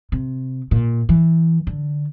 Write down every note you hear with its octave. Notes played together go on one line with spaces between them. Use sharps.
C3
A#2
E3
D3